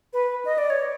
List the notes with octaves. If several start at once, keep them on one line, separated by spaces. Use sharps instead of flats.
B4
D#5
D5
C#5